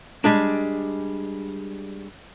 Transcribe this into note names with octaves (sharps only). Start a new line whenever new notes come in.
G3 G#3 D4